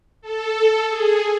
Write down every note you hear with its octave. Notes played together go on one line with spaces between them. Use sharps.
A4
G#4